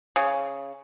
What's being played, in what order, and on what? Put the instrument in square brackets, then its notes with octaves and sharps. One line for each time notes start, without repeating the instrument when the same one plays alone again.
[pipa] C#3